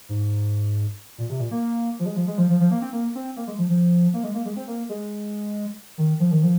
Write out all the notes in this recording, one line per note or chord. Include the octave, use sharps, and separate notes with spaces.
G#2
A#2
C3
A#2
A#3
F3
G#3
F3
G#3
F3
F3
F3
A#3
C4
A#3
C4
A#3
G#3
F3
F3
A#3
G#3
A#3
G#3
C4
A#3
G#3
D#3
F3
D#3
F3